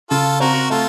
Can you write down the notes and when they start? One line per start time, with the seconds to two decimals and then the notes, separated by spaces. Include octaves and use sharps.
0.10 C#3 F4 A4
0.40 C4 F#4 A#4
0.70 A3 F4 A4